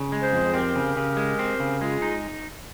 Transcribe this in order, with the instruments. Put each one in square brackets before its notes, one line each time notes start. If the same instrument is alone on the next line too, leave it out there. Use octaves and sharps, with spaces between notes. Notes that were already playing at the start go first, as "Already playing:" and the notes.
Already playing: [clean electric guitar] C#3
G#3
[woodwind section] G#4 C5
[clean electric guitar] F2
[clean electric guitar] C4 [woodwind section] G4 A#4
[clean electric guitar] C#3
C#3
G#3
C4
C#3
[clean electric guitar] G#3 [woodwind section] F4 G#4
[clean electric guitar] D#4